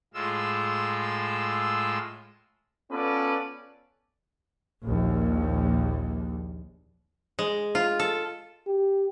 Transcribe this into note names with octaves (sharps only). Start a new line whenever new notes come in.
A2 G#3 F4 E6
B3 C#4 F4 A4 B4 D5
A#1 D#2
G#3
F4
A4
G4